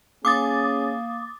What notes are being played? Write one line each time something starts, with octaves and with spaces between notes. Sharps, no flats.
A#3 C#4 G#4 D6 D#6 A6